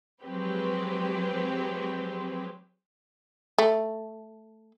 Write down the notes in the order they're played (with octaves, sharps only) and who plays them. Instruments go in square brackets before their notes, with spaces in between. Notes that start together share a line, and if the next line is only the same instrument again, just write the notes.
[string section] F3 F#3 G#3 C4 G4 B4
[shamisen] A3